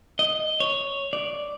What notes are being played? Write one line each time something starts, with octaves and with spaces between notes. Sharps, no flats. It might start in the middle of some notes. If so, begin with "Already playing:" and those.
D#5
C#5
D5